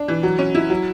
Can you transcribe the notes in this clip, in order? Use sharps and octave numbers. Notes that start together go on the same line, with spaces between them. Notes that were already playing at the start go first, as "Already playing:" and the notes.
Already playing: D4
E3
F#3
C#4
E4
F#3